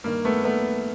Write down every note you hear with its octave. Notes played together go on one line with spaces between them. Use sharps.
G2 D#3 A#3
A3 B3
A3 B3